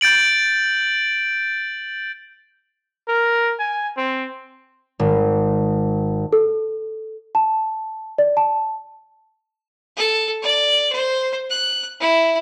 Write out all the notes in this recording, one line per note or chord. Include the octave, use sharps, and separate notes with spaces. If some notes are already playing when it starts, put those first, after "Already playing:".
G6 A6 D7 F#7
A#4
G#5
C4
G#1
A4
A5
D5
A5
A4
D5
C5
F#6
E4